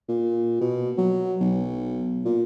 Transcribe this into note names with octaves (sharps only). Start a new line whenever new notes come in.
A#2
B2
F#3
B1
A#2